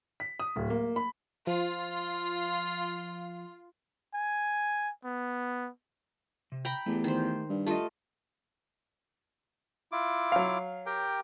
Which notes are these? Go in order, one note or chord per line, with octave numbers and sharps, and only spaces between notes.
B6
D#6
D1
A#3
B5
F3 F4
G#5
B3
C3
G5 A#5 B5
E2 A3 G4
D#3 C5
G2
A3 F4 G4 D5 D#5
E4 F4 D6
F#3 F5
G4 A#4 G5